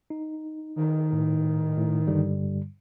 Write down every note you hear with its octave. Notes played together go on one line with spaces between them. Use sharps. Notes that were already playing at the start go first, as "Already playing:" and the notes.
D#4
D#3
A2
A2
G2 D3 G3